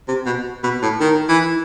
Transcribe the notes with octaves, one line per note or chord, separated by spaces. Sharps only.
C3
B2
B2
A2
D#3
E3